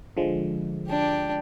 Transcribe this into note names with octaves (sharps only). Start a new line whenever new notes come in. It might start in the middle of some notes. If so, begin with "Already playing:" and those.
D3 F3 G#3
D4 G4